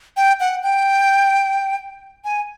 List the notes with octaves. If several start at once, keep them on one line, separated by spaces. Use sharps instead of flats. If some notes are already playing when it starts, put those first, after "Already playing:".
G5
F#5
G5
G#5